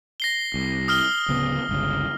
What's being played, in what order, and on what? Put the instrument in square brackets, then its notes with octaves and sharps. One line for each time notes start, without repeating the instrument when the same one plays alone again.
[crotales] A#6 C7 G7
[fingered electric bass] C2
[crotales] D#6 F6 G7
[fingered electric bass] D1 C#3 B3
G1 C#2 C#3